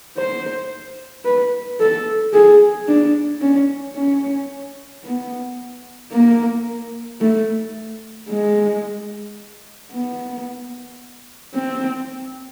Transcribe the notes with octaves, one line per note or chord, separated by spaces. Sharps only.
C5
B4
A4
G#4
D4
C#4
C#4
B3
A#3
A3
G#3
B3
C4